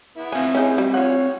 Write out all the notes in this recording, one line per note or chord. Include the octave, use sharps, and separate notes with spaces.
B3 E4
E3 F3 C4 G#5
C#4 D#4 G#4
G3
F4 C#5 F#5